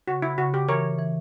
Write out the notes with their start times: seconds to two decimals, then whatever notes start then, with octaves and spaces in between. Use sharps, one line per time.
0.08 C#3 F#4
0.22 E4
0.38 C#3 F#4
0.54 G4
0.69 E3 A#4 C#5
0.99 E3